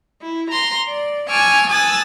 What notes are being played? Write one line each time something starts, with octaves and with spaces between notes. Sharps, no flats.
E4
A#5 C6 A#6
D5
G#5 A5 C#6 D6 E6 F6
G#5 A5 D#6 E6 F#6 A6